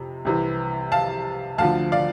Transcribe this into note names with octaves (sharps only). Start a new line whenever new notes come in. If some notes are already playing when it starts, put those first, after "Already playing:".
Already playing: F2 C3
C2 C3 E3
F5 A5
D2 D3 F3 F5 A5
D5 F5